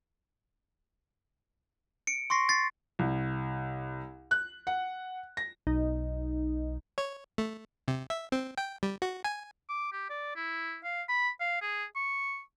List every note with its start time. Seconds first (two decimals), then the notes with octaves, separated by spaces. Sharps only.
2.07 C#7 D7
2.30 C6 C#6 A#6 C7
2.49 A6 C7
2.99 C2
4.31 F#6
4.67 F#5
5.37 A#6
5.67 B1 D#4
6.98 C#5
7.38 A3
7.88 C3
8.10 E5
8.32 C4
8.58 G5
8.83 G3
9.02 F#4
9.24 G#5
9.69 D6
9.93 G4
10.10 D5
10.36 E4
10.84 F5
11.09 B5
11.40 F5
11.61 G#4
11.96 C#6